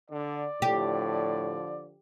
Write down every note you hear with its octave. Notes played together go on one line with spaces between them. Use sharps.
D3 D5
A2 D3 F3 G4